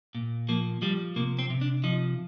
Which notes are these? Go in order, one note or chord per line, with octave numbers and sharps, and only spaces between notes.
A#2
F3 A#3
F3 G3
C3 A#3
C4
C3
D4
F3 D#4